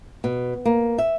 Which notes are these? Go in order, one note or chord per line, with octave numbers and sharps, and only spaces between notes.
B2
A#3
E5